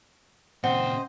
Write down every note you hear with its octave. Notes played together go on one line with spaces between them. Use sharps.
A#2 C#3 C4 C5 D#5 F#5